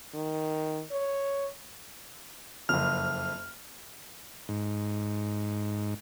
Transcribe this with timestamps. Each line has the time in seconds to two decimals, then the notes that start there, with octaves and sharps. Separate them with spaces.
0.15 D#3
0.91 C#5
2.69 F#1 F2 F6
4.49 G#2